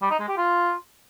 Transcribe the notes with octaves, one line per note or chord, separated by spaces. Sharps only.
G3
D#4
G#3
G4
F4